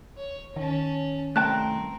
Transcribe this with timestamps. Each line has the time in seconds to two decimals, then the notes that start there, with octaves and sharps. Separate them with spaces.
0.17 C#5
0.56 D#3 C#4 A5
1.36 C2 A3 C4 A#4 G5 A5 F#6